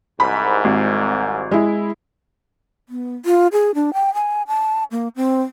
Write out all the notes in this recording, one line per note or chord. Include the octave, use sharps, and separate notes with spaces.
C2 G#2 B5
G#1
G#3 E4
B3
F4
G#4
D4
G5
G#5
A5
A#3
C4